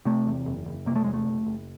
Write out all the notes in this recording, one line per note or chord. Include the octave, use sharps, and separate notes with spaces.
C3 A3
E2
F#1
F#1
C3 A#3
A3
E2 G#3
A3
F#1
F#1